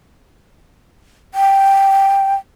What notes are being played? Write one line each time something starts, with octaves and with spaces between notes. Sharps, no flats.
G5